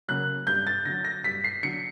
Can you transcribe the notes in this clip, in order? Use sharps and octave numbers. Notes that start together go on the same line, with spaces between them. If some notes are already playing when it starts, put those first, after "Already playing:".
C#3 F#3 A#3 F#6
G2 G6
A6
D3 F#3 A#6
A#6
G2 B6
C7
D3 F#3 C#7